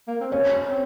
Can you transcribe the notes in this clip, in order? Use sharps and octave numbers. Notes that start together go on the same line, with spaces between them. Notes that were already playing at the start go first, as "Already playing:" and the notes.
A#3
C4
C#4 C#5
C4